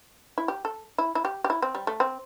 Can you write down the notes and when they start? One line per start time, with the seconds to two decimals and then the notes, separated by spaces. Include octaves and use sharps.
0.38 E4
0.48 G4
0.65 A4
0.98 E4
1.15 E4
1.25 G4
1.44 G4
1.50 E4
1.62 C4
1.75 G3
1.87 A3
2.00 C4